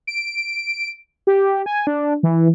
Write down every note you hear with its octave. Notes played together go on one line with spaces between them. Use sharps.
D7
G4
G#5
D4
E3